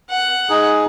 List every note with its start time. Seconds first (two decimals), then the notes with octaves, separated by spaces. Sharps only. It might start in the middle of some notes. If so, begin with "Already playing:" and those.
0.10 F#5
0.49 D#4 G#4